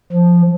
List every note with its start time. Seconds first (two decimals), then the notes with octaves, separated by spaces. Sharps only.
0.12 F3